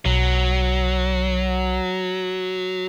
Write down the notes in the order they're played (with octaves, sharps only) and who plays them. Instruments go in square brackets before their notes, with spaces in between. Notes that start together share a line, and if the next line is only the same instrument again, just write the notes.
[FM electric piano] B1 [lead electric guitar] F#3